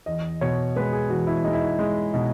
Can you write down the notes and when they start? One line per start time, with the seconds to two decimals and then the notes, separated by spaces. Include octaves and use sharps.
0.06 E2 D#5
0.41 B2 C#5
0.76 G#3 B4
0.92 G#4
1.10 E2 F#4
1.27 E4
1.44 G#3 D#4
1.53 E4
1.62 D#4
1.79 G#3
2.13 B2 D#4